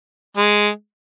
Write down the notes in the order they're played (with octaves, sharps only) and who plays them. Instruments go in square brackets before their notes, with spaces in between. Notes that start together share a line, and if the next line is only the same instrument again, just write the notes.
[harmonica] G#3